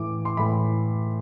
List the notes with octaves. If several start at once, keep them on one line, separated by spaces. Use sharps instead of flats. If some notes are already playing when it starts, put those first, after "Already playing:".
Already playing: A2 E3 D6
C6
A2 E3 B5